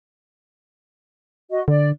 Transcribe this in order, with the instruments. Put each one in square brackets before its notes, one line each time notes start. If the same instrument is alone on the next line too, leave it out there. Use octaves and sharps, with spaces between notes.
[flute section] F#4 D#5
[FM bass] D3 [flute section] D5